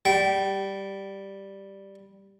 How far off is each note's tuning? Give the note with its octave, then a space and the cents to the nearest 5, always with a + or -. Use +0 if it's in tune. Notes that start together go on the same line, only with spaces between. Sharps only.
G3 +0 G5 -25